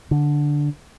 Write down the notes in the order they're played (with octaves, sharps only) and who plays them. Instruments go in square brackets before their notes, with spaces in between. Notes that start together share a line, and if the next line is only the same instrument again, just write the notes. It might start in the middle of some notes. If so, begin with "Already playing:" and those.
[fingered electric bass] D3